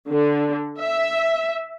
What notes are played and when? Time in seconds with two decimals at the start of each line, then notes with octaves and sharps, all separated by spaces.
0.10 D3
0.80 E5